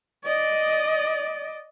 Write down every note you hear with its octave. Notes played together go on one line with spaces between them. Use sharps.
D5 D#5